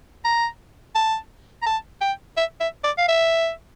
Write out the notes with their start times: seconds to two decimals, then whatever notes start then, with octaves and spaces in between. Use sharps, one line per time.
0.25 A#5
0.95 A5
1.62 A#5
1.66 A5
2.01 G5
2.37 E5
2.60 E5
2.84 D5
2.98 F5
3.08 E5